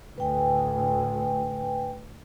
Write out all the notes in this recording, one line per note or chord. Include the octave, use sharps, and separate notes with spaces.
D2 A2 B4 G5 G#5